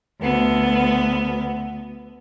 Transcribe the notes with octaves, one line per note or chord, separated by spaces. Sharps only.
D2 B3